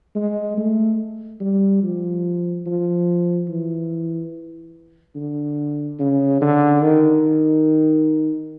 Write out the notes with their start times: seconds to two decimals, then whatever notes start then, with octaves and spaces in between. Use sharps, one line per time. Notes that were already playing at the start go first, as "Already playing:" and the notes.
0.15 G#3
0.58 A3
1.40 G3
1.83 F3
2.66 F3
3.48 E3
5.16 D3
5.99 C#3
6.41 D3
6.82 D#3